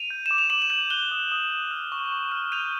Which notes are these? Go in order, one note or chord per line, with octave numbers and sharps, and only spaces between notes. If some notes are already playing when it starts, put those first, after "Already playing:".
Already playing: D#7 F7
G6
D6 E7
F7
D6 E7 F#7
F7
G6 E7 F#7
F#6 F7 G7
D#6
D#6
F#6
F6
C#6
C#6
F6
G6 D#7 F7